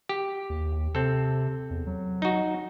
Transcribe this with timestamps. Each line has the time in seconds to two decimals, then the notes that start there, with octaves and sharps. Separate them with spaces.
0.09 G4
0.50 D#2
0.95 C3 C4 A4
1.70 E2
1.87 F#3
2.22 D#4 F#4